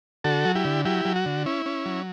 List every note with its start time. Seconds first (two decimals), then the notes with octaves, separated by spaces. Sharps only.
0.24 D3 F#4 A4
0.45 F#3
0.55 E4 G4
0.65 D3
0.85 F#3 E4 G4
1.05 F#3
1.16 F#4
1.26 D3
1.46 C#4 E4
1.66 C#4
1.86 F#3